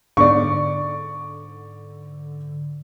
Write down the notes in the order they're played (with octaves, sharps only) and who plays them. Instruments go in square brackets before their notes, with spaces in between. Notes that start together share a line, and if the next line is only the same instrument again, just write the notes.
[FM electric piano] G#2 D3 [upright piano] D5 C#6